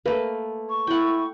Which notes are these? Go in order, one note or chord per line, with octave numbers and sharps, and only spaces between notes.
A3 A#3 A#4 B4
C#6
E4 F#5 G5